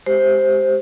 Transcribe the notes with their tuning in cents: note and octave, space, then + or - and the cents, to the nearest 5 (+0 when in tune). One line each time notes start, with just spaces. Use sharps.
G#3 +0 G4 -5 C5 +0